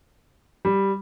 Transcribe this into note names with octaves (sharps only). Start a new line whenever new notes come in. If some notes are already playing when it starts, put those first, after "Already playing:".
G3